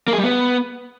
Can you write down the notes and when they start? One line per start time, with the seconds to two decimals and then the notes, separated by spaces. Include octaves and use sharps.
0.08 A#3
0.13 G#4
0.18 G3
0.24 B3